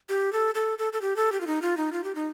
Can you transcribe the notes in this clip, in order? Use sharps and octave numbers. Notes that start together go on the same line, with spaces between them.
G4
A4
A4
A4
A4
G4
A4
G4
F4
D#4
F4
D#4
F4
G4
D#4